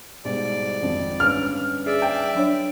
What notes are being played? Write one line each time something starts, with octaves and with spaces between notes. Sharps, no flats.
G#2 B2 G3 D5
G#1 F2 F3
G1 C#4 B4 F6
G#4 D5 E5
G5
F#3 D4 C#5